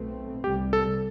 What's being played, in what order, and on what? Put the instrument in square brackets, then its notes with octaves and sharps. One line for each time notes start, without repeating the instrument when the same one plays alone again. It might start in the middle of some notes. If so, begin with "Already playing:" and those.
Already playing: [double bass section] B1 B2 A3 C4
[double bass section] C2 C3 G3 [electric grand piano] G4
[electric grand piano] A4